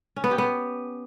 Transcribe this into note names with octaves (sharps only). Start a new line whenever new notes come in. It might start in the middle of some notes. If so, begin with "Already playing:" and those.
C#4
B3
G4
B3